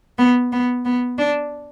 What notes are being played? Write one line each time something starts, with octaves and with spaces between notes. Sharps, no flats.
B3
B3
B3
D4